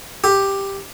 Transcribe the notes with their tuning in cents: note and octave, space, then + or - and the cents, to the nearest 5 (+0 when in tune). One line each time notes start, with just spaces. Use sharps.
G4 +5